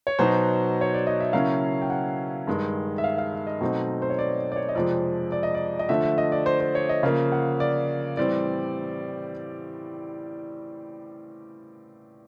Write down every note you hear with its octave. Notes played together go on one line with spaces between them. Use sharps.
C#5
B2 F#3 B3 D#4 C5
C#5
D5
D#5
E5
C#3 F#3 A#3 C#4 E4 F5
G5
F#5
G2 D#3 G#3
E5
F5
F5
E5
D#5
B2 F#3 A3 C4 D#4
C5
C#5
D5
D5
C#5
D#5
F2 C3 F3 G#3 D5
D5
D#5
D5
D#5
D3 F3 A3 E5
E5
D#5
D5
C5
C5
C#5
D#5
C#3 F3 A#3 F5
F#5
D5
A2 E3 G3 C4 D5